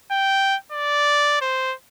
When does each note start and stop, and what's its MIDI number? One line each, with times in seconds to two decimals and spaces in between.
0.12 0.56 79
0.72 1.40 74
1.42 1.74 72